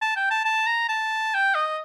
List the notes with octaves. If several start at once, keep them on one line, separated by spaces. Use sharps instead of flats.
A5
G5
A5
A5
A#5
A5
G5
D#5